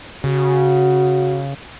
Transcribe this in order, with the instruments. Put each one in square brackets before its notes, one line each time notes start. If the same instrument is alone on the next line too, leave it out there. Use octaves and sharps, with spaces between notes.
[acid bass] C#3 [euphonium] F#4